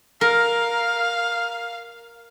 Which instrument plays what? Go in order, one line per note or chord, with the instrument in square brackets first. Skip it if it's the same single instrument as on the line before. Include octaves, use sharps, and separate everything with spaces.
[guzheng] A#4 [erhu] F5